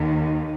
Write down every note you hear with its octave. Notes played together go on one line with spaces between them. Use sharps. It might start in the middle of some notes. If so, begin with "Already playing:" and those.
Already playing: D#2 D#3